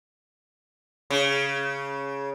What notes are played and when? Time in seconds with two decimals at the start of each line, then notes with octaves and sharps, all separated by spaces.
1.10 C#3